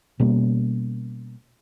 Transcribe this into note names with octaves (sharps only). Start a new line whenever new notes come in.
B2 G3 A#3 C#4